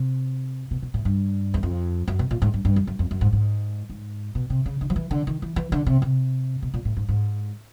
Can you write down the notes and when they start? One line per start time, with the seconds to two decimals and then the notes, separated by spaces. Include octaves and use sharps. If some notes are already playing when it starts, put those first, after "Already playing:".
Already playing: C3
0.71 B2
0.82 B2
0.94 A2
1.05 G2
1.54 E2
1.63 F2
2.08 F#2
2.19 B2
2.31 A#2
2.42 G#2
2.54 G2
2.65 G2
2.76 F#2
2.87 F#2
2.99 F2
3.11 F#2
3.21 G#2
3.33 G#2
3.89 G#2
4.35 B2
4.50 C3
4.66 C#3
4.81 D3
4.90 F3
4.96 E3
5.11 D3
5.27 D#3
5.42 E3
5.56 E3
5.72 D3
5.86 C3
6.02 C3
6.62 B2
6.74 A#2
6.85 A2
6.97 G#2
7.08 G#2